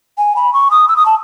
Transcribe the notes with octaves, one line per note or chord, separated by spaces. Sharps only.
G#5
B5
C#6
D#6
E6
D#6
A5